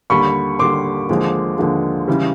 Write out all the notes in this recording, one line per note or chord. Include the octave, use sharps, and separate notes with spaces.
D#2 D3 G3 B5 C#6
D#2 D3 G3 C6 D6
D#2 D3 F3 G#3
D#2 D3 F3 G#3
C#3 E3 G3